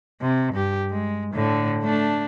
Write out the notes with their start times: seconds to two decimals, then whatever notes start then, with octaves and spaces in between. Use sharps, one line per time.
0.21 C3
0.54 G2 G4
0.91 G#3
1.34 A2 D3
1.84 A3 D4